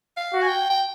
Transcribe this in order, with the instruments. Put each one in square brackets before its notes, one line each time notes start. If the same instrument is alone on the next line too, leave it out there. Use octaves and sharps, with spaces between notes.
[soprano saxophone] F5
[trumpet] F#4
[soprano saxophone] G#5
G5
G5